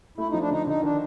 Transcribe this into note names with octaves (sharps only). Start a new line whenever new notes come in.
A3 E4
F3 D#4
D4
D3 D#4
D3 D#4
D#3 D4